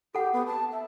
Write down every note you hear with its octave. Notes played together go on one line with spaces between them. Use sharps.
G4 A4 F#5
B3
A5
E5